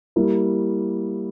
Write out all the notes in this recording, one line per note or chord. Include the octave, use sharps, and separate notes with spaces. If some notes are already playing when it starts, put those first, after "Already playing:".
G3 A#3 E4 A#4